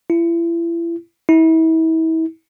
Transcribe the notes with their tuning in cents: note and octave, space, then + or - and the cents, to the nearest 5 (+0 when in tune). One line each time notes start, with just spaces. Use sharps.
E4 +35
E4 -35